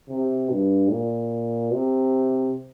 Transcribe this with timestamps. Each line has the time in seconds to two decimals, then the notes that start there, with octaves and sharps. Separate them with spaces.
0.09 C3
0.50 G2
0.91 A#2
1.73 C3